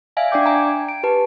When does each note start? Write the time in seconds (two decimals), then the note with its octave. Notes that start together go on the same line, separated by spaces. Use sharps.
0.17 D5 E5 F5 G#5
0.31 D4 D5 G5 D6 G6
0.46 G#5 A#5
0.67 G5
0.89 D7
1.03 G4 B4 A5